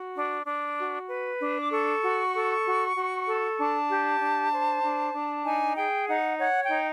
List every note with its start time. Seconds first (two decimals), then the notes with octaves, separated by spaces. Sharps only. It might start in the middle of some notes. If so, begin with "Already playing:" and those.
Already playing: F#4
0.15 D4
0.46 D4
0.78 F#4
1.09 B4
1.40 D4
1.61 D6
1.71 A4 C#6
2.03 F#4
2.34 A4
2.65 F#4
2.96 F#4
3.27 A4
3.58 D4 A5
3.89 G4
4.20 D4
4.52 C5
4.83 D4
5.14 D4
5.45 D#4 G#5
5.76 G#4 G5
6.08 D#4 F#5
6.38 C#5 F#5
6.63 G5
6.69 D#4